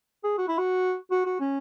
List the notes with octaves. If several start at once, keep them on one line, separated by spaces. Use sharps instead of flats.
G#4
F#4
E4
F#4
F#4
F#4
C#4